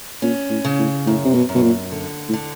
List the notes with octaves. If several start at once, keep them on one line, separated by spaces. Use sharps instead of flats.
A#2 C#4
A2
C#3
A2
F#2 A2
C3
B2
F#2
B2
A#2
D3
A2
D3